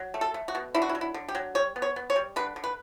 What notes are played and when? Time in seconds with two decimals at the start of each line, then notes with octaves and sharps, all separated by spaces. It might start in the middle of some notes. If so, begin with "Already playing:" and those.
Already playing: F#3
0.14 A3
0.21 A4
0.34 A3
0.48 F#4
0.55 B2
0.75 D3 E4
0.82 F#4
0.89 E4
0.95 F#3
1.01 E4
1.14 D3
1.28 G4
1.35 F#3
1.55 G3 C#5
1.76 B3
1.82 C#5
1.96 B3
2.10 C#5
2.16 G3
2.36 D3 B4
2.56 D3
2.64 B4